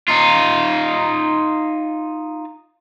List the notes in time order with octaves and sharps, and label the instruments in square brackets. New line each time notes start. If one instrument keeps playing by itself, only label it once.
[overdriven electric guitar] D#4 F4